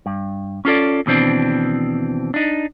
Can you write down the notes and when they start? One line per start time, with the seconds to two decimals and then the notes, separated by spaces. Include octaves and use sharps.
0.06 G2
0.65 C#4 F4 A4 D5
1.06 D#2 B2 E3 C4 D4
2.34 D4 D#4